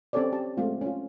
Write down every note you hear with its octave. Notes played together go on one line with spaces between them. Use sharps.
C4 C#4 G4 A4 C#5 D5
G4 A5
G#3 A3 C4 F4
C#4 F4